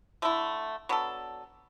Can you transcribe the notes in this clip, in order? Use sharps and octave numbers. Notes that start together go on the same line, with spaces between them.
D3 A3 E4
F#3 B3 D4 A4